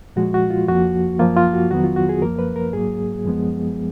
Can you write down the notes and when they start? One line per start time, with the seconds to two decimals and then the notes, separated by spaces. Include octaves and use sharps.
0.16 A#2 F3 G#3 F#4
0.34 F#4
0.50 F4
0.68 F2 F3 A#3 F#4
1.19 F#2 F3 A#3 F4
1.37 F4
1.53 F#4
1.71 F2 D#3 F#3 B3 F#4
1.84 F4
1.96 F#4
2.09 G#4
2.22 F#2 F3 A#3 A#4
2.39 B4
2.56 A#4
2.73 G#2 F#3 A#3 G#4
3.25 F#2 F3 G#3 B3